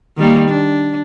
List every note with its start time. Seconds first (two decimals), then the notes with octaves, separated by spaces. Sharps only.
0.18 D#3 G3 A#3
0.49 D4